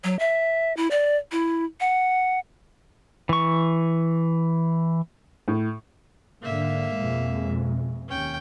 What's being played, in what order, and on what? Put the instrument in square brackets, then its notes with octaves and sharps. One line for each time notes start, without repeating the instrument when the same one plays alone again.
[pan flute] F#3
E5
E4
D5
E4
F#5
[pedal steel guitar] E3 C#6
[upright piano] A2
[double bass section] G#2 D3 [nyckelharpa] A#3 E5
[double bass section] F2 B2 G#3
[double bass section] D#2 [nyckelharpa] C#4 G5